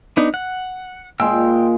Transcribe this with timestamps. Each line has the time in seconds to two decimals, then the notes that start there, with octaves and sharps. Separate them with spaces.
0.17 B3 D4 D#4
0.34 F#5
1.20 A#2 G#3 G5 C6 E6